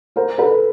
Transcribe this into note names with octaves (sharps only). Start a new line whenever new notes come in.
A#4 C5
A4 B4